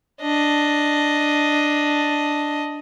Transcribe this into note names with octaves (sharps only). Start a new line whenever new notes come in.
D4 D#5